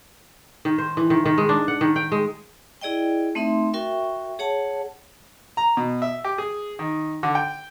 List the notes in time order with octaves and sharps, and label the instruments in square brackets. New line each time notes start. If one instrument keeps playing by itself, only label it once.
[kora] D#3
C5
E3
D#3
D#3
G#3
D4
F#5
D#3
G5
G#3
[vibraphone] E4 G#4 D5 D#5 G5
A3 C4 D#4 E5 C6
F#4 A#4 E5 G5 C#6
G#4 C#5 F#5 A5
[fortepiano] A#5
B2
E5
G4
G#4
D#3
D3
G5